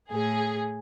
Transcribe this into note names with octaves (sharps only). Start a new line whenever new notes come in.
A2 G#4